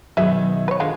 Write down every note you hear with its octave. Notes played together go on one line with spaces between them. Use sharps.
B2 D#3 F#3 G#4 E5
B4 C#5
D3 D#3 G#3 F4